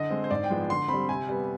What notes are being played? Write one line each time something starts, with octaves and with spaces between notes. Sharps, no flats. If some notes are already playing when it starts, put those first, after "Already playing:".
Already playing: D3 D#5
G#3 C4
C5
G#2 D5
G5
F3 G#3 B3
D3 C6
G3 C4 B5
C3 G#5
G3 B3